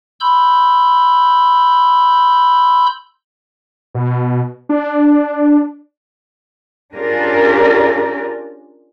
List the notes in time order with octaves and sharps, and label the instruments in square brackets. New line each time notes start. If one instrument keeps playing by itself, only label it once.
[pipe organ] B5 C6 E6 G6
[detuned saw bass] B2
D4
[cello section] C#4 D4 F4 G4 G#4 A#4